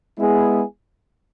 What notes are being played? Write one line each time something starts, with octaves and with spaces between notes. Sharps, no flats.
G#3 B3 E4 G#4